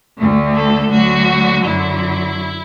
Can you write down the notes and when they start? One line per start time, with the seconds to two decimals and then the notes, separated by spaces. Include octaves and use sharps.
0.17 D2 D3 A3
0.54 A4
0.90 D2 D3 F#3 F#4
1.64 F#2 D3 F#3 E4